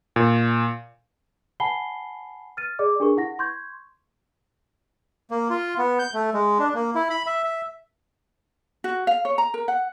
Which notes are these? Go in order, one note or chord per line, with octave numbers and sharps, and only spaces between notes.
A#2
F#5 G#5 A5 B5 C7 G7
F6 A6 D#7
G#4 D5 D#5 D6
D4 G4 G#4 A#4 C#6
E4 F#5 A#6
C6 C#6 G6 G#6
A#3
F4
B3
G6
A3
G#3
D4
A#3
E4
B5
E5
E5
F#4
F5
C#5
A#5
A#4
F#5